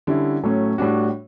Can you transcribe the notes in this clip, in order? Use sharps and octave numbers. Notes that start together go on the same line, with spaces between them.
D3 G3 C#4 E4
A2 F#3 A3 C#4
A2 G3 D4 F#4